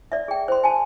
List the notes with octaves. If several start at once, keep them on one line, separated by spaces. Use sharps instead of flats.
D5 E5
G#4 G5
C5 C6
G#5 A5